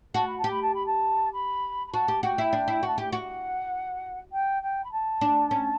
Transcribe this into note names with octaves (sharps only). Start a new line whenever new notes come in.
F#4 A5
B5
A5
G4
B5
A5
B5
A5
B5
B5
F#4 A5
G4
F#4 G5
E4
D4
E4
F#4 A5
G4 G5
F#4 F#5
G5
G5
B5
A5
D4
C#4